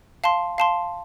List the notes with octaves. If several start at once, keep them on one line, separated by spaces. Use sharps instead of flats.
F5 A5 C6
F5 A5 C6